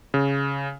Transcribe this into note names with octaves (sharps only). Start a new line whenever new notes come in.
C#3